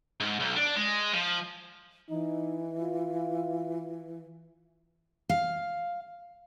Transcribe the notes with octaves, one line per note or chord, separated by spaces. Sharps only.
G#2
B1
D4
G#3
F3
E3 D#4
F4
F5